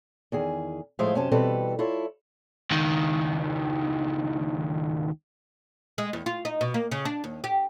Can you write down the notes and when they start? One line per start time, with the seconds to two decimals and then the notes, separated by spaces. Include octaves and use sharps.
0.32 E2 D#3 G#4
0.99 A2 F3 G#3 C5 E5 F5
1.15 F#2 C3 C#4 C5 A5
1.31 B2 E3 G3 C4 A4 B4
1.79 E4 F4 A4 C#5
2.71 C#2 D#3
5.98 G#3
6.13 E2
6.26 F4
6.45 D#4
6.61 B2
6.74 A#3
6.92 C#3
7.05 D4
7.24 D#2
7.44 G4